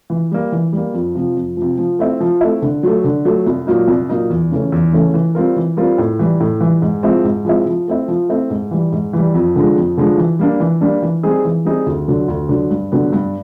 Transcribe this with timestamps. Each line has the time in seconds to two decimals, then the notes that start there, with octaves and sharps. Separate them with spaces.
0.10 E3
0.32 G3 A#3
0.52 E3
0.73 G3 A#3
0.94 F2
1.15 C3 F3
1.36 F2
1.57 C3 F3
1.78 F3
1.99 A3 C4 E4
2.20 F3
2.41 A3 C4 E4
2.62 D3
2.83 F#3 A3
3.04 D3
3.25 F#3 A3
3.46 C2
3.67 A#2 F#3 A#3 D#4
3.88 C2
4.09 A#2 F#3 A#3 D#4
4.30 E2
4.51 C#3 E3 A3 C#4
4.72 E2
4.93 C#3 E3 A3 C#4
5.14 E3
5.35 G3 C4 F4 A#4
5.56 E3
5.77 G3 C4 F4 A#4
5.98 A2
6.19 E3 G3
6.40 A2
6.61 E3 G3
6.82 G#2
7.03 F3 G#3 C4 E4
7.24 G#2
7.45 F3 G#3 C4 E4
7.66 F3
7.88 A3 C4 E4
8.08 F3
8.29 A3 C4 E4
8.50 G#2
8.71 E3 G3
8.92 G#2
9.13 E3 G3
9.34 F2
9.56 D3 F3 G#3
9.76 F2
9.97 D3 F3 G#3
10.18 E3
10.39 G3 A#3 D4
10.60 E3
10.81 G3 A#3 D4
11.02 E3
11.23 G3 C4 D#4 G#4
11.45 E3
11.65 G3 C4 D#4 G#4
11.86 D2
12.08 D3 F#3
12.28 D2
12.49 D3 F#3
12.70 G2
12.92 D3 F#3 B3
13.13 G2